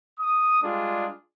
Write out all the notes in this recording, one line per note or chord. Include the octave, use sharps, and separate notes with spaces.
D#6
G3 G#3 D4 F4 G#4